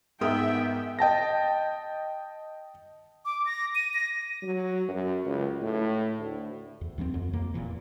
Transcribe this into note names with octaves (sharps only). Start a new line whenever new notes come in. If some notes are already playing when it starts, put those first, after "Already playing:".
G#2 B3 A#4 E5 G5 D#6
D#5 G5 A5 A#6
D6
A#6
D#7
A#6
F#3
F#2
C#2
A2
D2
E2
D#2 F3 A#3 C4
F2
F2 A#3
F1 E2 A#2 E3